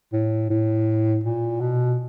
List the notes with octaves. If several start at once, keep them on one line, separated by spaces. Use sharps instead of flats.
A2
A2
A#2
B2